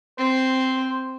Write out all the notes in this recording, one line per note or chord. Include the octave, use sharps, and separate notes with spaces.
C4 C5